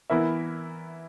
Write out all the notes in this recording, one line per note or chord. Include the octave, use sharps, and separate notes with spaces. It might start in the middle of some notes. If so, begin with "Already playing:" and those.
E3 B3 E4 A#4 E5